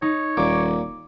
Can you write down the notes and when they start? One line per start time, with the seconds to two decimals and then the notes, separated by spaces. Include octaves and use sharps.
0.02 D#4 C#5
0.37 D#1 A#2 D6